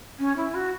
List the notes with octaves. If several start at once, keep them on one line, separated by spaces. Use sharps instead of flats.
C#4
E4
F#4